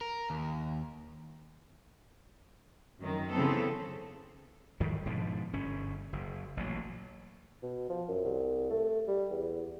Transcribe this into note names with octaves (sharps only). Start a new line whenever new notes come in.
A#4
D#2
F#2 D#3
C#3 E3 B3 C4 A4
G#2 D#3 F#3 G3
G#2 B2 D3 F3
G1 C#4
F#1
A1 A#2 F#3
B2
F3
F#2
C2
A3
G3
E2